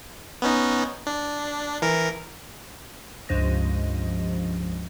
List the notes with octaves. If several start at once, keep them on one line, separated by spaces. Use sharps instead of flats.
B3 C#4 D#4
D4
E3 A#4
C#2 G2 F3 D#5